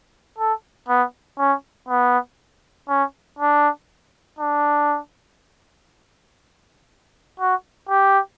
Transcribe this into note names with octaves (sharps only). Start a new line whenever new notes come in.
A4
B3
C#4
B3
C#4
D4
D4
F#4
G4